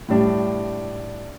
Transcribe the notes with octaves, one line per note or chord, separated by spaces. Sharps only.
A2 G3 D4